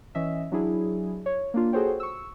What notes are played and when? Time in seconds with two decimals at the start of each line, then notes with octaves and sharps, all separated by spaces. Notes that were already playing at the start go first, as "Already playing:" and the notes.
0.15 E3 C#4 D#5 E5
0.52 F#3 D4 E4 G#4
1.26 C#5
1.54 A#3 D4 F4
1.73 F#4 G#4 A4 C5 C#5 G5
2.00 C#6 E6